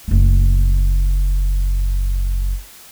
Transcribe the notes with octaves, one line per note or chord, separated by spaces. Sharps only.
F#1 A3